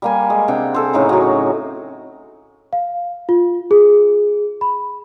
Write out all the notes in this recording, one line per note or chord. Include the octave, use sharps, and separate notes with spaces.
G3 A#3 G#5
G#3
C3 D4 F#5 G5
G#4 A4 C5
A2 C#3 D#4 G#4
F#3 F#4
F5
F4
G#4
B5